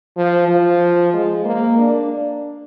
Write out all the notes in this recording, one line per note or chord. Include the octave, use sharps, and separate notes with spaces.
F3
F3
G#3
A#3
D4